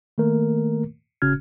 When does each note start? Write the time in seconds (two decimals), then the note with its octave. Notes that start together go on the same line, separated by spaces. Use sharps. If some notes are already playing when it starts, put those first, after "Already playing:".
0.18 D#3 A3 A#3 A#4
1.22 G1 C#3 C#4 F#4 F6 G#6